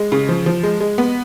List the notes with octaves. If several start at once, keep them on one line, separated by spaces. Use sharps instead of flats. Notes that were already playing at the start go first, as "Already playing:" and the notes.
Already playing: G#3
C#3
F3
F3
G#3
G#3
B3